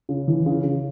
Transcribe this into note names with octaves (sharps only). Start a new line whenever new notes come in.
C#3
E3
C#3
C#3